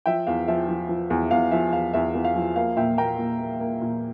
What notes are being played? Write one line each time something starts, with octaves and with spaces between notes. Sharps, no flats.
F3 E5 G5
E2 F5
F3 E5
F3
F3
E2
E2 F5
F3 E5
E2 F5
E2 E5
E2
F5
F3
A#3 F5
A#2 E5 G5
A#3 G5 A#5
A#2
A#3
A#3
A#2